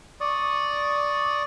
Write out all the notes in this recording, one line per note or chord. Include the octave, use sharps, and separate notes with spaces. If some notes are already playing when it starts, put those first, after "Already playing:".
D5 C#6 D#6